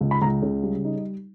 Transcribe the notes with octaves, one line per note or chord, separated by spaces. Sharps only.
C#2
B5
C#2 A#5
C#3
G3
D#4